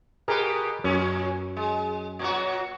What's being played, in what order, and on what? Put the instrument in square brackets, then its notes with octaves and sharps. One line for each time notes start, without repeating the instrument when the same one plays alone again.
[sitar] B2 G4 B4 [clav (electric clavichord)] G#4 A#4
[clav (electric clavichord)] F#2 [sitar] A#2 C#4
[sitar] G#3
A#2 F#3 F#4